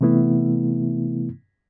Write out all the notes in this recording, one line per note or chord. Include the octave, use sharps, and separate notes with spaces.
C3 E3 A3 B3 E4